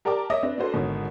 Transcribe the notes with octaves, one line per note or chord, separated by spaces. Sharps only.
G4 A#4 D5 G5 A5 D6
C#5 D#5 E5 D6 D#6 A#6
C4 D4 B4
D4 F#4 A4 B4 C5
G#1 B2 D3 C#4